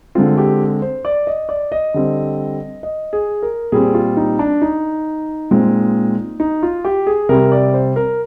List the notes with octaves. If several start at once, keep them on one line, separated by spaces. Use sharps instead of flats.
D3 G#3 C4 F4
G4
C5
D5
D#5
D5
D#5
D3 G3 C4
D#5
G#4
A#4
A#2 G3 C4 G#4
F4
D#4
D4
D#4
A#2 G#3 C4
D#4
F4
G4
G#4
C3 G3 C4 A#4
D5
C5
A#4